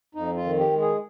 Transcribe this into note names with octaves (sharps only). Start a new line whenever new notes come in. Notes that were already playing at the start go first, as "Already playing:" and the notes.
F2 D#4
F4
D#3
G4
G#3
G#4